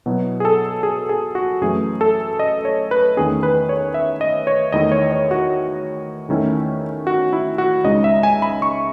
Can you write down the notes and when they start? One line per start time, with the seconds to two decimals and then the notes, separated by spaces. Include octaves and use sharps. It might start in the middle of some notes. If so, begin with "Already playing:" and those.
0.06 B2 F#3 B3 E4
0.40 G#4
0.45 A4
0.83 G#4
1.09 G#4
1.35 F#4
1.61 F#2 E3 A3 G#4
2.01 A4
2.39 D#5
2.65 C#5
2.91 B4
3.17 E2 D#3 A3 C#4 G#4
3.43 B4
3.69 C#5
3.94 E5
4.21 D#5
4.47 C#5
4.72 E2 D#3 A3 E4 D#5
4.92 C#5
5.12 C#5
5.31 F#4
6.29 E2 D#3 A3 C#4 E4
7.07 F#4
7.33 E4
7.58 F#4
7.84 C#2 C#3 G#3 D#4 D#5
8.04 E5
8.23 G#5
8.42 B5
8.62 C#6